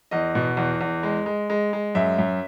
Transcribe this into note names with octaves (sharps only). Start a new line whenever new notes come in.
E2 D#5
B2
E2
E2
G#3
G#3
G#3
G#3
F#2 E5
F#2